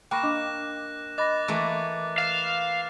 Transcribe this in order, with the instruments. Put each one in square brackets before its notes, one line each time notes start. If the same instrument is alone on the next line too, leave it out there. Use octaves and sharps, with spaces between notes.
[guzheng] A#3 [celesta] G5 B5 C#6 [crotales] F#6 A#6 E7
[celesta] D4 D#5 D6
[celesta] D#5 B5 A#6 [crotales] D6 F#6 A6
[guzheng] E3 A3 A#3
[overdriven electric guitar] F5 [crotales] F6 A6 E7